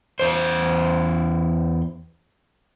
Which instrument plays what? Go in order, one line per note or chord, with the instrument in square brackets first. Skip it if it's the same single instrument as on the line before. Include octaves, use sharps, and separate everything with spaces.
[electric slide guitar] E2 C5